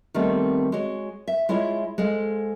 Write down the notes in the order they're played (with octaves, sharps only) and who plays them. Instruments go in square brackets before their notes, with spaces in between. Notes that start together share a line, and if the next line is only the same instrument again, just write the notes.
[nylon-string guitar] D#3 G3 A3 B3 C4
G#3 F#4 C#5
E5
G#3 E4 F4 C#5 E5
G#3 A4 C5 F5